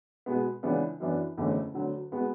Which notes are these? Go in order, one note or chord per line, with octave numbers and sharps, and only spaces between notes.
B2 G#3 B3
C#2 C#3 E3 B3 D4
F#2 E3 B3 D4
F#1 E2 D3 A3 C#4
D2 D3 F#3
G#3 B3 F#4